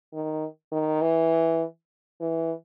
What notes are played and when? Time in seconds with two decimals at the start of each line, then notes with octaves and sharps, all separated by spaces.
0.13 D#3
0.72 D#3
1.01 E3
2.21 E3